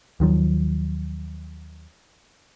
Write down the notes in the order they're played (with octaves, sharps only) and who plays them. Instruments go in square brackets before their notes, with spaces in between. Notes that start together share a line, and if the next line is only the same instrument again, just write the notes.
[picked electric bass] D#2 D#3 F3 F#3